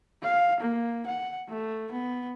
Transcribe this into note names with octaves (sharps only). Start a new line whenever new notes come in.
F5
A#3
F#5
A3
B3